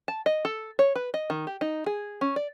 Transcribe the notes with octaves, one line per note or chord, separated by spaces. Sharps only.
A5
D#5
A4
C#5
B4
D#5
D#3
G4
D#4
G#4
C#4
D5